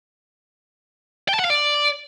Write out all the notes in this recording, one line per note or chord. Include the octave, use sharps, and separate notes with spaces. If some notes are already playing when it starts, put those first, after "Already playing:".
G5
A5
F#5
F5
D5